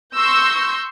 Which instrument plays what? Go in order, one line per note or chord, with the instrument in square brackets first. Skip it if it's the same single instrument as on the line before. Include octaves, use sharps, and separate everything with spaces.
[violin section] C6 C#6 E6 G6 A#6